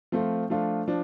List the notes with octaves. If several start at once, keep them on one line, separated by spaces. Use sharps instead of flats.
F3 A3 C4 F4
F3 A3 D4 F4
F3 D4